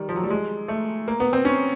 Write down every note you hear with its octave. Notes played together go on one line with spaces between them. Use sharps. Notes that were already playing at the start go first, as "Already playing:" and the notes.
Already playing: D#3 G3
F3
F#3
G3
G#3
A3
A#3
B3
C4
C#4